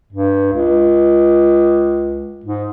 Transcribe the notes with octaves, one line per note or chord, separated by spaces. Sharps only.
G2
C#2
G#2